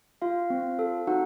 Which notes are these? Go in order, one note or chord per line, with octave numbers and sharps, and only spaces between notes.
F4 F5
C4
A4
D#4 F#4 F#5